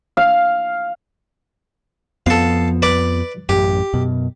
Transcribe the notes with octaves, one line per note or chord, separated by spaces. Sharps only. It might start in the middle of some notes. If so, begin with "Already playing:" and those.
F5
F2 F3 B3 A4 F5
B4 D5 D6
A1 F#2 G4
F#2 B2